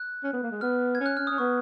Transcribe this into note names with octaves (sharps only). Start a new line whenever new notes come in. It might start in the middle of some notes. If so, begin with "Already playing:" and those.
Already playing: F#6
C#4
B3
A#3
G#3
B3 F6
G#6
C#4
F#6
C#4 F6
C#4 D#6
B3 C#6